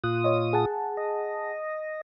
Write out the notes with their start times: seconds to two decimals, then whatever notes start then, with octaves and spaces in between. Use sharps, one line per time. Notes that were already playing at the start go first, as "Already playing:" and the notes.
0.04 A#2 F4 D#6 F#6
0.24 C#5 D#5
0.53 G#4 F#5 A5
0.97 D#5